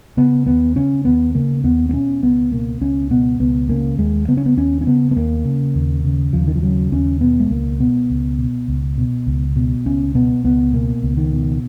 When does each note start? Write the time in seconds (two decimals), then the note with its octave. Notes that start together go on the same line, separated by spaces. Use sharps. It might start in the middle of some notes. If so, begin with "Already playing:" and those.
0.17 C#3 B3
0.46 D#2 B3
0.76 C#3 C#4
1.05 D#2 B3
1.35 C#3 A#3
1.64 D#2 B3
1.89 B3
1.93 B2 C#4
2.23 C#2 B3
2.52 B2 A#3
2.81 C#2 C#4
3.10 B2 B3
3.40 C#2 B3
3.69 C#3 A#3
3.98 D#2 G#3
4.28 C#3 B3
4.37 C#4
4.46 B3
4.57 D#2 C#4
4.81 C#4
4.87 C#3 B3
5.11 B3
5.16 D#2 A#3
5.45 C#3
5.75 D#2
6.04 C#3
6.33 D#2 F3
6.47 D#3
6.55 F3
6.63 C#3 F#3
6.92 D#2 C#4
7.21 B2 B3
7.40 G#3
7.51 C#2 A#3
7.80 B2 B3
8.10 C#2
8.39 B2
8.68 C#2
8.98 B2
9.27 C#2
9.56 B2
9.85 C#2 C#4
10.15 B2 B3
10.44 C#2 B3
10.73 B2 A#3
11.03 C#2
11.17 D#3
11.32 B2